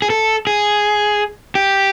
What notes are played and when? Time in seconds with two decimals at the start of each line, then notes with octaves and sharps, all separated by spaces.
0.02 G#4
0.10 A4
0.47 G#4
1.55 G4